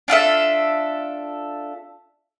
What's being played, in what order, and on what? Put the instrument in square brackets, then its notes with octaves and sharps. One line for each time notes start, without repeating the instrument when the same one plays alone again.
[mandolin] D4 F4 A4 E5